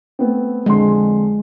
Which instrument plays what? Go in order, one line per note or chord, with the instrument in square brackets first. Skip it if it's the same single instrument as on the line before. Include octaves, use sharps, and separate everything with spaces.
[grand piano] A3 B3 C4
[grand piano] F2 D3 C6 [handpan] G#3